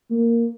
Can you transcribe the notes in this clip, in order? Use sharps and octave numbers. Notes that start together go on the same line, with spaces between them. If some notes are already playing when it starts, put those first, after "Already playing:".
A#3